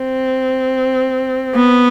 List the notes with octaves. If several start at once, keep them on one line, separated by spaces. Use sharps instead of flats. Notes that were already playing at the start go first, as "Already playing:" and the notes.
Already playing: C4
B3